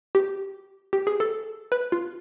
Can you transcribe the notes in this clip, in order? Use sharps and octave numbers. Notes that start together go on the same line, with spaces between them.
G4
G4
G#4
A4
B4
F4